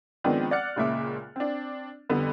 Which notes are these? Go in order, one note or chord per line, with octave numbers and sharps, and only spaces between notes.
D#3 F3 G#3 B3 C4 D4
D5 F#5 F6 F#6 A6 C#7
C#2 A#2 C#3 E5 D6
C4 D4
F2 D3 G3 B3